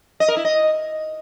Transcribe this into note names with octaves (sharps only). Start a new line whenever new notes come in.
D#5
A#4
E4
D#5